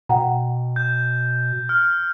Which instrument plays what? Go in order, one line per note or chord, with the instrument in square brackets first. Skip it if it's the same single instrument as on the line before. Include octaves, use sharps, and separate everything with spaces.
[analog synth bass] B2 [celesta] F#5 G5 A#5
[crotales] G6
F6